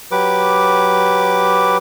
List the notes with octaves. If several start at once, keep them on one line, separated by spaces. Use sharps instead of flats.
F#3 G4 B4 D6